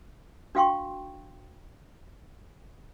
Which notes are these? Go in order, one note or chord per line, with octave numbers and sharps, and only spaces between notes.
D4 F#4 F5 G5 C6 C#6